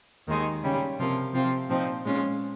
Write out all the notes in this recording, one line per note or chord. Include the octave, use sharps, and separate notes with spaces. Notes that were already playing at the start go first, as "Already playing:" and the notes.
D#2 D#3 G#3 D#4
C#3 G3 C#4
C3 F3 A#3 F4
C3 F3 C4 F4
A#2 F3 C4 D#4
A#2 G#3 C#4 F4